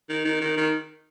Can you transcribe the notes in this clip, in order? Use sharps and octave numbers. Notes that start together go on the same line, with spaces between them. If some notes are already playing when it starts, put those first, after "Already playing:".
D#3
D#3
D#3
D#3